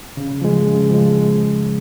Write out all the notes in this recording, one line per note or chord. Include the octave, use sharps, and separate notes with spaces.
C#3
F3 G#3
C#3
F3 G#3